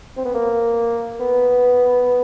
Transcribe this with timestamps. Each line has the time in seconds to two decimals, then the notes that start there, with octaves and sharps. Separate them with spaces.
0.17 C4
0.25 B3
0.34 A#3
1.20 B3